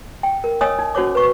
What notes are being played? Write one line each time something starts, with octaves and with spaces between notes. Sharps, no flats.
G5
A#4
C#5 D#5 G#5 D#6 E6
D#4
C#4 F#4 C5 C#5 D6
B4 C#6